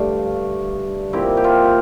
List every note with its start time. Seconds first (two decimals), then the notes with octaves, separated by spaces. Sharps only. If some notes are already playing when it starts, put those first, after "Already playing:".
Already playing: G2 D3 A3 D4 D5 F5
1.13 A#2 F3 C4 E4 G4
1.37 G4
1.44 F4
1.64 F4